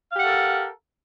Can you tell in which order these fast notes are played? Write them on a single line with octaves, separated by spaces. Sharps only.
F5 G4 F#5 A4 A#4